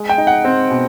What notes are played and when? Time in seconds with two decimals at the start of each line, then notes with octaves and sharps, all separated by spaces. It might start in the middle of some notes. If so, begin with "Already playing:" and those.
Already playing: G#3
0.09 G5
0.18 D#4
0.27 F#5
0.45 C4
0.71 B2